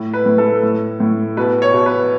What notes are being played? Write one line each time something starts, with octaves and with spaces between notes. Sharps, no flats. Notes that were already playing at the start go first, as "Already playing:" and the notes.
Already playing: A2
B4
A2
A4
A2
A2
B2 B4
C#5
B2
B4